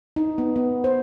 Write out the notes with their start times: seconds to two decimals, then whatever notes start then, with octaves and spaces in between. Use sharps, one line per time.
0.16 D#4
0.38 B3
0.56 B3
0.84 C5